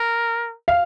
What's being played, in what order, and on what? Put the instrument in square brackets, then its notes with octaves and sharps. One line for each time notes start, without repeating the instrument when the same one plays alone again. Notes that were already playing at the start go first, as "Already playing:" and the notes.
Already playing: [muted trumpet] A#4
[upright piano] F5